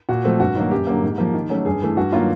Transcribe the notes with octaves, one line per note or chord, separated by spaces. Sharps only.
A#2 F#4
F3 A3 C4
G2 F#4
D#3 F#3 A#3
F#2 G4
D3 F#3 A#3
G#2
F3 A#3
D#3
F#3 A3 C#4
G2 G#4
E3 A3
G2 F#4
D#3 F#3 A#3 F4